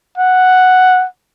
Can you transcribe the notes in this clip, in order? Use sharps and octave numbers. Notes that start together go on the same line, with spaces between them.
F#5